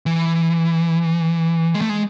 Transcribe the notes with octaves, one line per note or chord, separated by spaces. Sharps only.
E3
G#3
A3
G#3